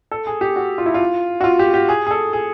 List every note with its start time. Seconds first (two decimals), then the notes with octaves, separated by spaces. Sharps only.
0.11 A4
0.27 G#4
0.41 G4
0.56 F#4
0.78 F4
0.86 E4
0.94 F4
1.41 F#4
1.44 F4
1.59 G4
1.74 G4
1.89 G#4
2.07 G#4
2.11 A4
2.33 G#4